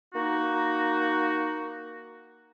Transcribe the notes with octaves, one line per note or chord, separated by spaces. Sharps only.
A#3 D#4 F#4